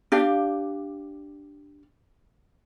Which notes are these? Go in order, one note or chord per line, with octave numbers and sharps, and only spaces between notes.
D4 G4 F5